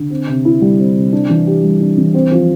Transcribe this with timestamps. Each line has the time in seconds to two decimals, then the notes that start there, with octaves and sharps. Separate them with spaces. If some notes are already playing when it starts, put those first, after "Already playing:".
Already playing: D3
0.10 C4
0.28 C3
0.45 E4
0.61 G3
0.78 C4
0.96 C3
1.13 D4
1.29 E3
1.47 G4
1.63 G3
1.81 D4
1.98 E3
2.14 C4
2.31 F3